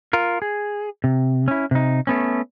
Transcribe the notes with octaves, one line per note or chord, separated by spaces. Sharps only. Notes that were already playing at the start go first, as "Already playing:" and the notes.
F4 A#4
G#4
C3
C#4 E4
C3 D#4
A3 B3 C#4